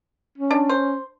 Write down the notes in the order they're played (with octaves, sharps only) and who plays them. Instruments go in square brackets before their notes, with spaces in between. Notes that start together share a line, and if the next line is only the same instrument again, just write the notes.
[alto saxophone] C#4
[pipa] D4
C5